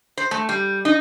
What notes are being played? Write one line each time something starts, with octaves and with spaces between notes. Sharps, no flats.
C5
A3
G3
D#4